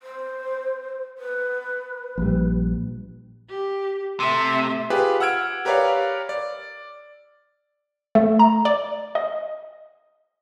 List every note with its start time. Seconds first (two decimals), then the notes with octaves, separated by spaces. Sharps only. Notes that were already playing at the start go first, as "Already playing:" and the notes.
0.03 C5
1.18 B4
2.18 A#1 G3
3.49 G4
4.20 C3 A3 E5
4.90 F4 G4 G#4 B4
5.20 F#5 E6 F6 G#6 D7
5.65 G4 A#4 B4 C#5 D5 F5
6.29 D5
8.15 A3
8.39 A#5
8.65 D5
9.15 D#5